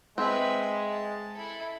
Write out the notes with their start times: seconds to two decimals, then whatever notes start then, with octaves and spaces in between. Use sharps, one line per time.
0.18 G#3 C4 B4 E5
0.89 A5
1.35 E4 A4